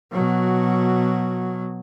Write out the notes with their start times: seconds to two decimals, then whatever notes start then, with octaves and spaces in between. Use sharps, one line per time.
0.12 B2 F#3